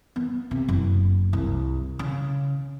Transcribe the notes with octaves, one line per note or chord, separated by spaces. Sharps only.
B3
C3
F#1
C2
C#3